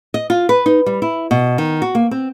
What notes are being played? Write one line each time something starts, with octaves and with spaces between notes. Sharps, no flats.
D#5
F4
B4
D#4
G3
E4
B2
D#3
F#4
A#3
C4